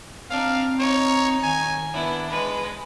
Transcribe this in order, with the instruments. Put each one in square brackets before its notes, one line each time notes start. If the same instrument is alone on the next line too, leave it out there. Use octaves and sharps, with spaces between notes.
[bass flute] C4 [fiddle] D4 D#4 [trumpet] F5
[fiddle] D#4 [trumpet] C#5
[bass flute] D#3 [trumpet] G#5
[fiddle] B3 E4 [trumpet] D4
[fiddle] G#3 B4